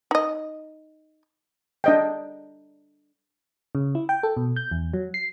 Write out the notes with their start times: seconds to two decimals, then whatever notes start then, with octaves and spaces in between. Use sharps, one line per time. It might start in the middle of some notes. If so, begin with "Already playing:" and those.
0.11 D#4 D#5
1.84 D4 D#5 G5
3.75 C#3
3.95 E4
4.09 G5
4.23 A4
4.37 B2
4.56 G6
4.71 E2
4.94 F#3
5.14 C7